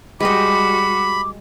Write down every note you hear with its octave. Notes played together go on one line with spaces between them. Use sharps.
G3 G#3 F#4 G4 D#5 B5 D6